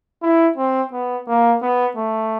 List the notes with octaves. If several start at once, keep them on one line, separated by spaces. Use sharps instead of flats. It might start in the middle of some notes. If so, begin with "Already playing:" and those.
E4
C4
B3
A#3
B3
A3